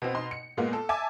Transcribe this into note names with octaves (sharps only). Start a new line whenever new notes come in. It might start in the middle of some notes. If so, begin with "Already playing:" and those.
B2 B3 C4
B2 D#4 C6
C#7
A#2 G#3 A#3 B3
A4
E5 G#5 A5 D6